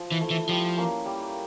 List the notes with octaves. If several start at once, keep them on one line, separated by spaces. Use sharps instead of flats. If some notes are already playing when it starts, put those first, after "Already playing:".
Already playing: F3
E3
A3 E4
E3
F3 G3
A#3 C#4
G3